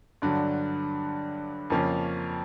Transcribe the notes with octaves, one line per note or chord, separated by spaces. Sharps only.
G2 D3 F#3
F2 C#3 F3 A#3 C#4